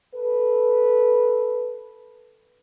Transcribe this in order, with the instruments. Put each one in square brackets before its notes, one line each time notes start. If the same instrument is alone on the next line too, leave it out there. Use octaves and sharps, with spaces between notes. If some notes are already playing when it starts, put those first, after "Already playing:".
[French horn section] A4 B4